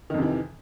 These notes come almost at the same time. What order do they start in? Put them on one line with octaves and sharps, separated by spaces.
D#3 F2 C3 E3